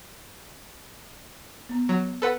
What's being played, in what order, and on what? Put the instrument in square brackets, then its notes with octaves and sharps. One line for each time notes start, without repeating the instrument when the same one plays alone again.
[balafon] B3 A#5
[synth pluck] F#3
A4 B4 F#5